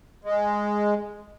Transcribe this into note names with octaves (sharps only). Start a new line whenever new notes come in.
G#3